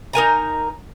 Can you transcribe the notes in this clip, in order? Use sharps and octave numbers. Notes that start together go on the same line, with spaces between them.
D#4 A#4 G#5 A#5